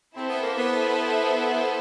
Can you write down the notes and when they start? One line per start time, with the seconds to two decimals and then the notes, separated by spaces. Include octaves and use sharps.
0.16 C4 E4 A4 C5 E5
0.30 B3
0.42 A#3
0.56 B3